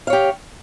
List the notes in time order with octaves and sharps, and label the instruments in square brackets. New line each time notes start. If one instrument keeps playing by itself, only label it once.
[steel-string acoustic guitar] F5
C#5
G4